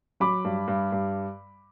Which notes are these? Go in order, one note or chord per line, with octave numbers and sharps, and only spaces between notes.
F#3 B5 D6
G2
G2
G2